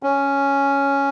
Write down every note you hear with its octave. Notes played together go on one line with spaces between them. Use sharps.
C#4